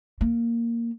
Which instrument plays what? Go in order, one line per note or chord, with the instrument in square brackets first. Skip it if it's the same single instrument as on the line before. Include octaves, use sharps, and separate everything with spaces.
[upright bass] A#3